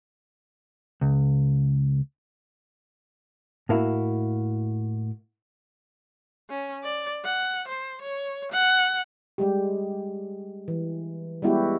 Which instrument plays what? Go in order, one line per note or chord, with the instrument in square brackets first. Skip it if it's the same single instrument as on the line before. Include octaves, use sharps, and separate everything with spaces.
[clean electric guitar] C#2
[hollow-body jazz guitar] A2 A#3 E4 F#4
[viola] C#4
D5
F#5
C5
C#5
F#5
[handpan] G3 G#3 G4
E3
G3 G#3 B3 E4 F#4 G4